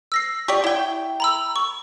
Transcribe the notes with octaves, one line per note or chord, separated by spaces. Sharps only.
E6 A#6 C7
G4 D5 C#6
E4 G5
A#5 B5 E6
C#6